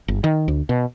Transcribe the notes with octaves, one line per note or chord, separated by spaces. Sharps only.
G1
D#3
D2
B2